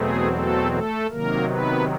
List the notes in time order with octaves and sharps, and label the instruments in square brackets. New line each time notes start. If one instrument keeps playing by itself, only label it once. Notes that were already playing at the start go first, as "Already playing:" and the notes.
Already playing: [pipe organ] E2 B2 F#3 A3 C4 G#4
A3 A4
A3 A4
C3 D#3 F#3 A#3 A#4
B3 B4